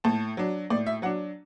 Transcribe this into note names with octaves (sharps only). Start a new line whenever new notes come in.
A2 A5
F#3 D4
A2 D5
E5
F#3 D4 F#5